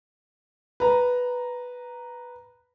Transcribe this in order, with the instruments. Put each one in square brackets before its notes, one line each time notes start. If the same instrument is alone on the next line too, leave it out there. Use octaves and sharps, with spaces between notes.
[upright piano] B4 A#5